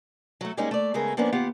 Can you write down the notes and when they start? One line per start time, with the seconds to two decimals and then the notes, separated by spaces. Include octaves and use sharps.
0.41 F#3 A3
0.57 G3 G#3 A#3 C#4 D#4 G#4
0.71 A3 D5
0.94 C#3 G#3 A3 B3 G#4 A#4
1.17 F3 A#3 B3 C#4 D4
1.32 D#2 B3 F4 G4 F5 F#5